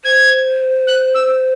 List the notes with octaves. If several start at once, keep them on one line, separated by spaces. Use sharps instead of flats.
C5 G#6
F#6
E6